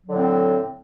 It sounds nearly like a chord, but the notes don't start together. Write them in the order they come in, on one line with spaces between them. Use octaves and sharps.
F#3 D3 A2 C4